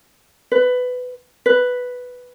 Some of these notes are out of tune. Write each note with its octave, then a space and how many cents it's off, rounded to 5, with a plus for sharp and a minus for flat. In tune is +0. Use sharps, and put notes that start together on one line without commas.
B4 +15
B4 +0